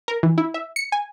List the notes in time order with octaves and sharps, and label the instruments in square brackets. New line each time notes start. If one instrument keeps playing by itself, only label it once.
[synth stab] A#4
E3
E4
E5
C#7
G#5